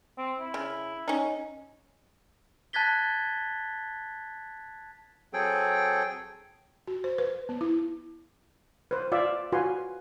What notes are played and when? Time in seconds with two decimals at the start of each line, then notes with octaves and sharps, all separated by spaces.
0.18 C4
0.40 E4
0.54 C#3
1.08 C#4 D#4
2.73 A5 F#6 G#6 A6 B6 G7
5.33 F#3 C4 G#4 A4 G5
6.88 F#4
7.04 C5
7.18 B4
7.49 B3
7.61 E4
8.91 B4 C5
9.12 F4 D5 E5 F5
9.52 F4 F#4 B4 G#5 C6